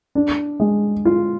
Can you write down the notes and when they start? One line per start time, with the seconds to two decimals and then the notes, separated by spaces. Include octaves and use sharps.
0.15 D4
0.60 G#3
1.05 F4